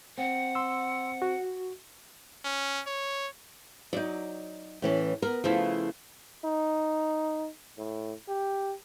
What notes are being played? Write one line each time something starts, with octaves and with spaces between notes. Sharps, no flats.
C4 F#5
C6 E6
F#4
C#4
C#5
F#3 D#4 D5
A2 E3 C#4
B3 A#4
C#3 F3 A3 E4 F4
D#4
A2
G4